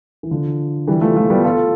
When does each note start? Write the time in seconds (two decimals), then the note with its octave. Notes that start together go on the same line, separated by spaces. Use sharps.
0.23 E3
0.31 D3 F3
0.88 E3 G3
1.01 F3 A3
1.16 F3 A3
1.30 G3 B3
1.44 F4 A4